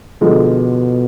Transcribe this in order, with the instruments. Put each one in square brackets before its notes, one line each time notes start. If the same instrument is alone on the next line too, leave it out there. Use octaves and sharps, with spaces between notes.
[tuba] B2 [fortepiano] D3 F3 G#3